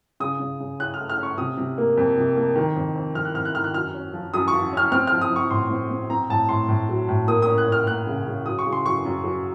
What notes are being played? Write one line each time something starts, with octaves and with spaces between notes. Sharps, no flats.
C#3 D#6
C#3
C#3
C#4 F#6
F6
A3
F6
C#4 C#6
C3 D#6
C3
A#3
F2
C3
A#3
D#3
F2
F2
F2 F6
F#6
F2 F6
F#6
D#3 F6
F#6
F#2 F6
C#4
F3
F#2 D#6
F3 C#6
C#4 F6
C4 F6
F3 F6
D#6
F3
C#6
A2 C6
C4
C4
C4 A#5
A2 A5
A2 C6
A2
F#3
A2
A#3 D#6
C#4 D#6
F#6
C#4
F6
A#3 F#6
C#3
C#3
F#3 D#6
C#6
C#3
C6
F#2 C#6
F#2
F#3